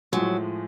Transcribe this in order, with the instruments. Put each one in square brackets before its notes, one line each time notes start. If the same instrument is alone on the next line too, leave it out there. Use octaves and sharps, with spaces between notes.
[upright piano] A2 F3 G#3 [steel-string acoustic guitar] F#3